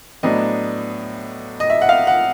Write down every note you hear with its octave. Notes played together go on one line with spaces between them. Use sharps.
A2 F#3 B3 D4 D#5
D#5
E5
F#5
F5
F#5